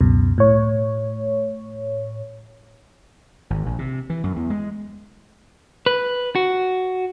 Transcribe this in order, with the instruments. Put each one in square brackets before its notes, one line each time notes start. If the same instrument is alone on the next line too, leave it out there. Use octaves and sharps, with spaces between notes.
[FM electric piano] C#2 F#2 B2
A2 C#5
[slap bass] G#1
A#1
C3
E3
F#2
E2
G#3
[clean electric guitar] B4
F#4